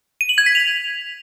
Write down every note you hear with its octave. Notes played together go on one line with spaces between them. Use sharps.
D#7
F#7
G#6
B6
F7